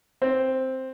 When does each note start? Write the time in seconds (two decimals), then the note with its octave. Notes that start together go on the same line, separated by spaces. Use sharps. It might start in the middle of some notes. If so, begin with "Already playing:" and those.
0.22 C4